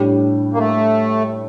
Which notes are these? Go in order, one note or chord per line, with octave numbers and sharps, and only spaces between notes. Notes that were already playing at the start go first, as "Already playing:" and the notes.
Already playing: A2 G3 D4 G4
A#3
A3